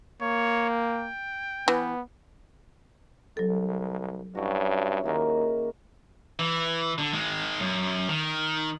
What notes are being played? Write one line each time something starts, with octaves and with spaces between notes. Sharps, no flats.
A#3 C#5
G5
E3 B3
C2 F#3 A4
G2 C#4 E4 F#4
D#2 D#3 A#3 G#4
E3
D3
D#3 G#3
F#2
D#3